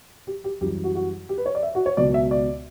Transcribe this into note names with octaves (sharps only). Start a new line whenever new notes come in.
G4
G4
F#2 E3 G3 G4
F#4
F#4
G4
B4
C#5
D5
E5
F#4
C#5
C#2 B2 F#3 D5
E5
D5